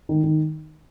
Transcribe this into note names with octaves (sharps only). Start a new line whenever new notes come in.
D#3
D#3